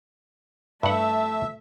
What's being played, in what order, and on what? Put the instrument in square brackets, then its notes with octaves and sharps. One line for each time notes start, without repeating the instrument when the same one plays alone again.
[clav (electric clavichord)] G2 F#5 [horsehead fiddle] A3 A5 [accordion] E5